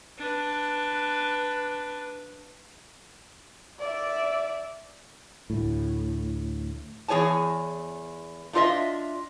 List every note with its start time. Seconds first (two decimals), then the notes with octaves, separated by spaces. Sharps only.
0.18 D4 B4
3.80 D5 E5
5.50 D2 A2
7.08 E2 G#4 C#5 G#5 A5
8.53 A3 D4 F4 A4 D#5 E5